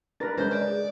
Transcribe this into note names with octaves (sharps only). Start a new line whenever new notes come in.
D4 A#4 B4 A6 A#6
G#3 C#4 B4 C5 G6
D5
G#4